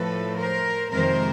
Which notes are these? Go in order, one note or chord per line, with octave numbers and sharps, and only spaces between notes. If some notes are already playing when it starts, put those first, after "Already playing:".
Already playing: A2 F3 A3 A4 B4
A#4 C5
F2 C3 D#3 G#3 A#4 C5